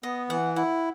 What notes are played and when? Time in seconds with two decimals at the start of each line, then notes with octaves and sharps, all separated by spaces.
0.03 B3 D#5
0.30 E3 F#5
0.56 E4 F#5